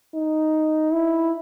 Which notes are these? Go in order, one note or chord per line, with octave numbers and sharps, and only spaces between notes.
D#4
E4